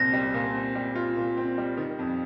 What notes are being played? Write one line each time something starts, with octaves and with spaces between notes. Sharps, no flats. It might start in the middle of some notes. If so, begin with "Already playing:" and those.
Already playing: C2 A#2 G3 C4 A#6
G3
A#2
C4
G3
F4
A#2
C4
G3
D#3
F2